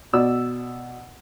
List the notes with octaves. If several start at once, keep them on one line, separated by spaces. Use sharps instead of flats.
B2 D5 E6